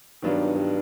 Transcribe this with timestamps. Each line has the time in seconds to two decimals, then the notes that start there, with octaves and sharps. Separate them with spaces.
0.22 G2 D#3 F#3 B3 D4 F4
0.54 G2